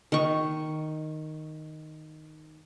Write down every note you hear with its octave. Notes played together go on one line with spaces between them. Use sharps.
D#3 C#6